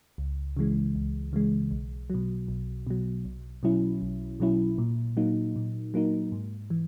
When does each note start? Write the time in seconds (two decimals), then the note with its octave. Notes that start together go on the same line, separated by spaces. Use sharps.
0.18 C#2
0.57 C#3 E3 G#3
0.95 C#2
1.33 C#3 E3 G#3
1.71 B1
2.10 B2 F#3
2.48 B1
2.87 B2 F#3
3.25 B1
3.63 B2 F#3 C#4 E4
4.02 B1
4.40 B2 F#3 C#4 E4
4.78 A#2
5.17 F#3 A#3 D#4
5.56 A#2
5.94 F#3 A#3 D#4
6.32 G#2
6.70 E3